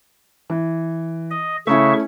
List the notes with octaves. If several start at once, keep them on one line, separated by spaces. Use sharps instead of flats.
E3
D#5
C#3 A3 C#4 E4 E5 C#6